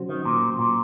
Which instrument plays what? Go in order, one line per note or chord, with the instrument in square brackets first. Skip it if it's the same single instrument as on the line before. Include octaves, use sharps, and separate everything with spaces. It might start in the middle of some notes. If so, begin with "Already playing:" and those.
Already playing: [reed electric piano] C3 F#3 C#4 F#4 C5
[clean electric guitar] D#3
A#2
A#2